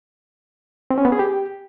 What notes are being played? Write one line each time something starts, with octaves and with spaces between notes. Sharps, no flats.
C4
C#4
B3
G#4
G4